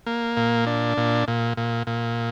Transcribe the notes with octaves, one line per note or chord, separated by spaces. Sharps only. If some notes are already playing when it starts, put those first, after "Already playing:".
A#3
A#2
D4
A#2
A#2
A#2
A#2